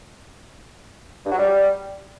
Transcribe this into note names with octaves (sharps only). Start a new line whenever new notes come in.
G2
F#3
G3